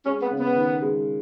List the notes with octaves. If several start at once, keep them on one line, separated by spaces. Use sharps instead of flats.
G#3 C#4
B3
C#3
B3
D#3
G#3